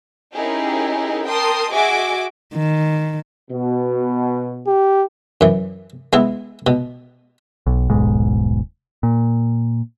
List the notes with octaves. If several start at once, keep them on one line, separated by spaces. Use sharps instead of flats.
C#4 D#4 E4 G4 G#4 A#4
A#4 G5 A5 C6 D#6
F#4 G#4 D#5 E5 G#5 D6
D#3
B2
G4
F#2 E3
G#3 B3 E4
B2
B1
D#1 B1 G#2
A#2